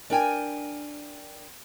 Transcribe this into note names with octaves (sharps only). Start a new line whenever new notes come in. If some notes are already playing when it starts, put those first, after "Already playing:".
D4 A#4 G5 G#5